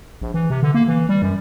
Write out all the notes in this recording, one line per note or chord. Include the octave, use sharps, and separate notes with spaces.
A#1
E3
C3
D3
A#3
E3
G3
F#2